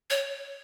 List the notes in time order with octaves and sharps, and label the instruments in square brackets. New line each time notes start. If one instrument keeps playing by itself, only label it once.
[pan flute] C#5